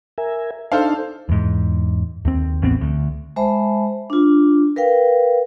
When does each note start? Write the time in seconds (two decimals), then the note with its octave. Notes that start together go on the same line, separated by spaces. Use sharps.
0.18 A#4 E5 G#5
0.72 D4 D#4 A4 C5 F5
1.29 E2 G#2
2.25 D#2 C4
2.62 A1 E2 B3 C4
2.81 D2
3.36 G#3 C5 E5 A5 B5
4.10 D4 F4
4.76 A#4 B4 F5 G5